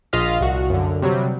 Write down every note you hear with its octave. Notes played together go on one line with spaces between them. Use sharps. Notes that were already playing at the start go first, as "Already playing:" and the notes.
A#1 F4 D#5 F5 F6 B6
C2 F#4
F#2 D3
C3 F#3 G3